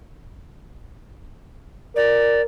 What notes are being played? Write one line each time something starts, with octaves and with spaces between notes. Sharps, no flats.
A#4 D5